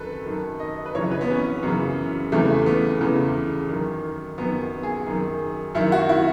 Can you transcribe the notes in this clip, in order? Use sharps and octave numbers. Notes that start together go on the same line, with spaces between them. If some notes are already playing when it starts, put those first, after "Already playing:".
Already playing: F#2 D#3 A4 B4
F#2 D#3
D#5
B4
F#2 C#3 E3 C#5
B4
B3
C#4
F#2 C#3 E3
E2 C#3 E3 A3
B3
E2 C#3 E3
F#2 D#3
F#2 D#3 B3
G#4
F#2 D#3
F#2 D#3 E4
F#4
E4